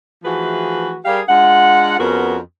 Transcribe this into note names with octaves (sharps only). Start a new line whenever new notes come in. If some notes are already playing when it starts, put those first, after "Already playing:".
E3 F3 A3 F#4 G#4 B4
G3 G4 G#4 A#4 F5
G#3 D4 F4 F#5
F2 B3 C#4 F#4 G#4 A#4